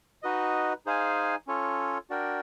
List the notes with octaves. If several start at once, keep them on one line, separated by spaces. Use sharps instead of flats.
D#4 F#4 B4 D#5
D#4 G#4 C5 F5 G#5
C#4 F4 A4 C#5
D4 F#4 A#4 D5 G5